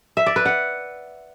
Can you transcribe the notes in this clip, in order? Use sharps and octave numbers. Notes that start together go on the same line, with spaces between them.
E5
D5
B4
F#5